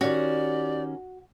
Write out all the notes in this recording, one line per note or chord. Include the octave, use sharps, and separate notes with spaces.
D#3 C#4 F#4 G4 D5